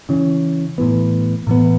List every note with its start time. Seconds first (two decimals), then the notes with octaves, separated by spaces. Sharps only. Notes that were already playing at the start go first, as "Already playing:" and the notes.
0.09 C#3 E3 C#4
0.78 A2 E3 B3
1.47 A2 E3 B3